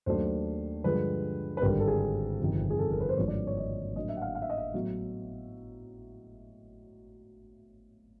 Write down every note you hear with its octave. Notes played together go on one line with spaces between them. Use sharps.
D#2 D#3 F#3 A3 D4 C5
G2 D3 F3 G#3 B4
B4
G#1 G2 D3 G3 A#4
A4
G#4
G1 F2 C3 D#3
G#4
A4
A#4
B4
C5
G#1 G2 D3 F3 A#3 C#5
D5
C#5
D#5
A2 F#3 A#3 D4 D#5
E5
F#5
F5
F5
E5
D#5
E5
A2 F#3 B3